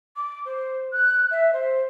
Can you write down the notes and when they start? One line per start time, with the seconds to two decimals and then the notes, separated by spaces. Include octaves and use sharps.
0.16 D6
0.45 C5
0.92 F#6
1.31 E5
1.53 C5